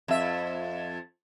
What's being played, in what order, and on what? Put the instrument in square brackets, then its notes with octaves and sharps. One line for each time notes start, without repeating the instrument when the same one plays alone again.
[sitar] F2 E5